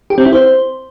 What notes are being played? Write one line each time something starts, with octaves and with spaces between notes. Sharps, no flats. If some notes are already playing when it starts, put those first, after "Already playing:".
G4
C4
E4
C5